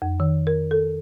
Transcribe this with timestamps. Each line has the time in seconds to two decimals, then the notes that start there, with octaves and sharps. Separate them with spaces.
0.02 F2
0.20 D#3
0.47 A#4
0.71 A4